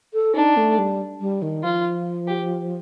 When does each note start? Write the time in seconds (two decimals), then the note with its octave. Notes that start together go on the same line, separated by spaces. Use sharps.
0.14 A4
0.35 D4 D#4
0.57 A3
0.78 G3
1.20 G3
1.42 D#3
1.64 F3 F4
2.28 G4